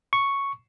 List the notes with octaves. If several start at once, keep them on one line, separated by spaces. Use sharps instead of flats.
C#6